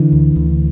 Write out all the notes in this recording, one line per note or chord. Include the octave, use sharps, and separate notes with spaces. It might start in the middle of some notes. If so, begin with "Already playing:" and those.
Already playing: D3 E3
D2
D2